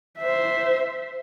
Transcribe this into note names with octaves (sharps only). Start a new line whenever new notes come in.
C5 E5